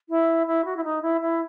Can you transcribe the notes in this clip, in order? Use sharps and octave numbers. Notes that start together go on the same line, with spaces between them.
E4
E4
F#4
E4
D#4
E4
E4